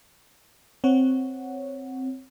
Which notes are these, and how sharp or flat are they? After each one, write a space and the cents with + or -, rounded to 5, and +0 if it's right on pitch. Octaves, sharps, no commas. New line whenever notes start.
C4 +0 C#5 +0 F#5 +0